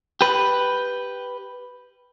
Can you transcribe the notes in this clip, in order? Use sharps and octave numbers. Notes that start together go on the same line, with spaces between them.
G4 B4